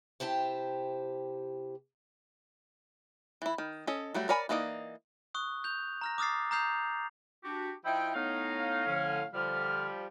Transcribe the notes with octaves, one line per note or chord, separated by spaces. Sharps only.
C3 E4 G4 C5 A5
E3 E4
D#3
C#4 A4 D#5
F#3 G3 A3 F#4
A#4 C#5 D5 G#5 B5
E3 A#3 D#4 D5 D#5
C#6 D#6 F#6
G6 F7
A#5 F6 A#6
D6 D#6 F6 A6 C7
A#5 D#6 F6 G6 C7 F7
D4 F#4 G4
F3 D#4 E4 G5
A2 B3 D#4 C#5 F5
D3 F3 C#4
D3 F3 G3 F6